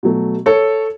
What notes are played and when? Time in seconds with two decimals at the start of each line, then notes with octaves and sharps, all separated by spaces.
0.03 B2 F#3 A3
0.46 A4 C#5